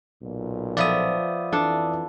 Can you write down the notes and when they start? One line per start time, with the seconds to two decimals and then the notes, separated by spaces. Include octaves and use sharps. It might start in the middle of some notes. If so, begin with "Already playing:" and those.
0.22 B1 A#2
0.77 F3 B3 D5 E5 D#6
1.53 F2 E3 D4 A4